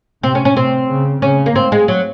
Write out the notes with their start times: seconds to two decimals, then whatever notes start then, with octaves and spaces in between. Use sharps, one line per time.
0.23 C3 C4
0.35 C#4
0.45 C#4
0.56 C3 C4
0.90 C#3
1.22 C#3 C#4
1.46 A#3
1.56 G#2 C4
1.72 G#3
1.88 F#3